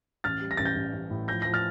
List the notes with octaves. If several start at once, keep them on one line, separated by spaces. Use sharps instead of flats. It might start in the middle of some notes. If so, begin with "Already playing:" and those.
A1 F6 A6
G3
A#6
A1 A6
G6 A#6
A1
A1
A2
F3 G6 A#6
F3 A#6
F6 A6